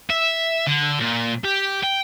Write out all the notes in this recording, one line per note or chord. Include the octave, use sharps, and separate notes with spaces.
E5
D3
A#2
G4
G5